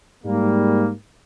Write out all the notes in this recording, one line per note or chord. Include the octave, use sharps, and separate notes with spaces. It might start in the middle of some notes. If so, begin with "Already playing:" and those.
G#2 G3 A#3